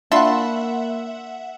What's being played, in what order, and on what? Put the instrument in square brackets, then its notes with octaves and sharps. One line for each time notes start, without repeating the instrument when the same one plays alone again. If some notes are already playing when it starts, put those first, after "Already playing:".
[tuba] A#3 [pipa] D4 E4 [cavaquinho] F4 C6 C#6 [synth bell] E5 F#5